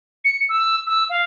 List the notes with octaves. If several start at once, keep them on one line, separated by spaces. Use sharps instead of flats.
C#7
E6
E6
F5